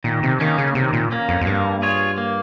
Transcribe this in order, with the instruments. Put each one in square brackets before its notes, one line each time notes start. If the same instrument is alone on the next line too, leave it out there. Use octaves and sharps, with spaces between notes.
[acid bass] A#2 [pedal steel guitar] D#3
[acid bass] C3
[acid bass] D#3 [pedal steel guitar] A#3 C#4
[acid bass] C#3
[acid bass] C3 [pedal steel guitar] D#3
[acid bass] A#2
[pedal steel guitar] A#3 C#4
[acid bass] F2
F2
[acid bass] G2 [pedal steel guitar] A#3
[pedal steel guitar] F4 G#4 C#5
A#3